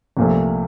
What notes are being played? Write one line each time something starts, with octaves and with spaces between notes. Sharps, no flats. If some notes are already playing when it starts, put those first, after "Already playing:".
C2 A#2 F3 A3